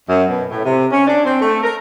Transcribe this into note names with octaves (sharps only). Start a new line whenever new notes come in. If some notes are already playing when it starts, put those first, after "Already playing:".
F#2
B2
A2
C3
C#4
D4
C4
A3
A#4